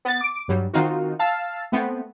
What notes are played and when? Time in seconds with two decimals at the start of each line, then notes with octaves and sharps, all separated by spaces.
0.05 B3 A6
0.21 D6 D7
0.48 G2 F#3 G3
0.73 D#3 C4 D#4 F4 F#4
1.19 F5 A5 E6
1.72 A3 B3 C4